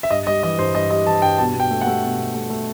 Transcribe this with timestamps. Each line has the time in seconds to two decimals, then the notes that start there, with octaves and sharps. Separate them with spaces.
0.03 E5
0.11 G2 D#5
0.27 G3 D#5
0.43 E3 D#5
0.59 G2 C5
0.75 G2 D#5
0.90 G3 D#5
1.06 E3 A5
1.22 G2 G5
1.38 B2 A5
1.54 B2
1.60 G5
1.71 A3
1.81 F#5
1.87 A3
2.02 B2
2.18 B2
2.34 A3
2.50 A3